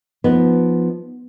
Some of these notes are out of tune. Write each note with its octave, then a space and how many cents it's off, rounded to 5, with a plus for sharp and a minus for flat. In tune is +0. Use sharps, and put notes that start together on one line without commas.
F3 +0 B3 -5 D#4 +0